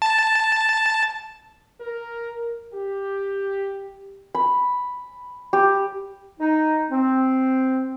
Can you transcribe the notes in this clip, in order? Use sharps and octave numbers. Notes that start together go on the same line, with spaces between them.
A5
A#4
G4
B5
G4
D#4
C4